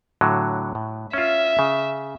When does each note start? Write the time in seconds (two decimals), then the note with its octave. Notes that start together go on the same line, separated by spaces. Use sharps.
0.21 A2 D3 F#3
0.75 A2
1.13 C#4 F4 E5
1.59 C#3